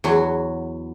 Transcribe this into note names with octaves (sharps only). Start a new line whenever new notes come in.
E2 F#3 F#4